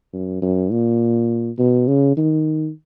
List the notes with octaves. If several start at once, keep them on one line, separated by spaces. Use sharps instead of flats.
F#2
F#2
A#2
B2
C#3
D#3